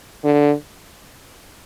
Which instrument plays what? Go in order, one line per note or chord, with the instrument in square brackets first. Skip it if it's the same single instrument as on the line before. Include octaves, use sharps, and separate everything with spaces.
[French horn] D3